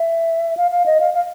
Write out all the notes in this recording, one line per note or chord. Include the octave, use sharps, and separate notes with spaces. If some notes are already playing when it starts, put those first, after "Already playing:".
Already playing: E5
F5
F5
D#5
F5
F5